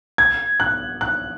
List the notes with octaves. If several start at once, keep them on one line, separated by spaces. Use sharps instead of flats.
G#6
F#6
F#6